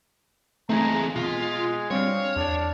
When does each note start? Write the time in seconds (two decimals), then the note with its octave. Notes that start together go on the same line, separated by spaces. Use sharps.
0.69 E3 A3 C4 D#4 G#4 A#5
1.16 B2 G#3 F4 B6
1.91 G3 C4 D4 C#5 F5
2.36 E2 D4